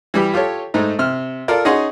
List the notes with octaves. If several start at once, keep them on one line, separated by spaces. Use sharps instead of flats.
E3 G3 G4
F4 G4 A4 C#5
G#2 A3 D#4
C3 F6
F4 A4 A#4 D5
C#4 D#4 G#4 D#5 F#5 C6